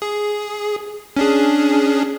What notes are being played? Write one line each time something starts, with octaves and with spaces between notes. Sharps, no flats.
G#4
C#4 D4 G#4